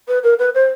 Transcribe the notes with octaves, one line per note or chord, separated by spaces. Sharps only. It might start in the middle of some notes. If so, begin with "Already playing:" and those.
B4
A#4
B4
C5